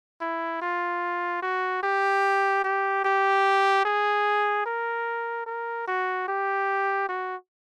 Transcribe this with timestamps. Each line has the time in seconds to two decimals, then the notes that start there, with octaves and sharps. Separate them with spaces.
0.21 E4
0.62 F4
1.42 F#4
1.83 G4
2.64 G4
3.04 G4
3.85 G#4
4.66 A#4
5.46 A#4
5.87 F#4
6.28 G4
7.09 F#4